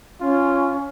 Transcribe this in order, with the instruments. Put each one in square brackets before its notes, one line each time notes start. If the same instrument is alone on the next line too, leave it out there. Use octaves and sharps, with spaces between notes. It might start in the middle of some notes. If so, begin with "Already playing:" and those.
[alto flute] C#4 [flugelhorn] F4